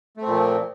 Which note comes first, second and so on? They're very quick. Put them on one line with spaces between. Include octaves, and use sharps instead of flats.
A3 C4 A#2 F3